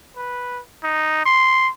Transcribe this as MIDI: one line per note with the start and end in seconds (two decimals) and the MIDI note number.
0.17 0.60 71
0.83 1.24 63
1.25 1.70 84